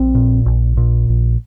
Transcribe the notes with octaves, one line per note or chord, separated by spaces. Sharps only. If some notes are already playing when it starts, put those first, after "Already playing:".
Already playing: A#1 C4
A#2
A#1
A#2
A#1